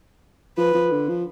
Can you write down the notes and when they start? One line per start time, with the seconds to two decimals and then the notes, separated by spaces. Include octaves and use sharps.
0.58 F3 B4
0.74 F3
0.91 D3
1.08 F3